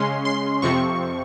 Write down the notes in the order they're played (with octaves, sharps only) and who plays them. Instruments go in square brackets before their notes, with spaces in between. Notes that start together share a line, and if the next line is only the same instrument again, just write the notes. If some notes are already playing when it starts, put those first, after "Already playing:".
Already playing: [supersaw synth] C#3 G#3 C#4 C6
C6
F2 C3 F3 C4 C#6